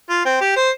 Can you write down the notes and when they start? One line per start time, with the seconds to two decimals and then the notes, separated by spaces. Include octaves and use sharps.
0.09 F4
0.25 C4
0.41 G4
0.56 C5